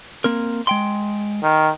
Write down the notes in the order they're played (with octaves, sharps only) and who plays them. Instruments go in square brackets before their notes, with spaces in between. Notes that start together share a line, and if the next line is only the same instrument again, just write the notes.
[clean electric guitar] A#3 C4 A#4
G#3 G5 C6
[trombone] D#3